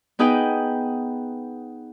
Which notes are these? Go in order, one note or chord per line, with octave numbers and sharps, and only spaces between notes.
B3 D#4 G#4 B4 G5